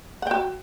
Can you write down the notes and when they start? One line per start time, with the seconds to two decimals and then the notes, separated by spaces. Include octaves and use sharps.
0.22 F#5
0.27 G5
0.31 F#4